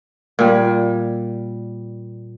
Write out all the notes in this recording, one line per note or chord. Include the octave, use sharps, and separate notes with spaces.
A#2 G3